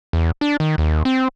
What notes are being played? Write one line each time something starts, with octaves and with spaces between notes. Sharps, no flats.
E2
D4
D#3
D#2
C4